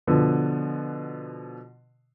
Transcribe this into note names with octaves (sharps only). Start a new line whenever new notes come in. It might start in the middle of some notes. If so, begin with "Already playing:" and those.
B2 D3 F3